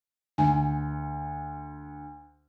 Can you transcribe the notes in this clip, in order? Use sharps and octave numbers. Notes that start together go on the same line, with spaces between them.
D2 G#5